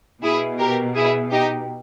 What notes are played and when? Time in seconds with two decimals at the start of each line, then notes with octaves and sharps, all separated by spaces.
0.23 B2 E4 G#4
0.59 G4 A#4
0.95 E4 G#4
1.31 D#4 G4